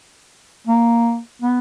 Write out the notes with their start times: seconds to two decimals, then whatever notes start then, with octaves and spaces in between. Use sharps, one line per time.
0.67 A#3
1.42 B3